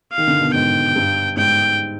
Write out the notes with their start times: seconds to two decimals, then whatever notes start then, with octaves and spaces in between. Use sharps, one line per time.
0.13 F5
0.18 D#3
0.28 D3
0.40 B2
0.54 G#2 G5
0.96 G2
1.37 G#2 G5